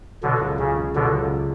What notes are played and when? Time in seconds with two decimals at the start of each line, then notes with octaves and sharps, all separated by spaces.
0.23 B2 D3 F#3
0.41 C#2
0.59 C#2 C#3
0.77 C#3
0.95 B2 D3 F#3
1.13 C#2